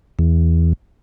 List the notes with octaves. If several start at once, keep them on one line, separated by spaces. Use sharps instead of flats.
E2